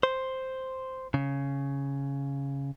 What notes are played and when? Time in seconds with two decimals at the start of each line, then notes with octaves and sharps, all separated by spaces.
0.03 C5
1.14 C#3